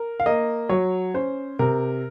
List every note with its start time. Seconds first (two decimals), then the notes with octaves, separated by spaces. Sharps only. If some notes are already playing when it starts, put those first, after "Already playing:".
Already playing: A#4
0.20 F5
0.26 A#3 D#5
0.69 F#3 C#5
1.14 C#4 C5
1.59 C3 A#4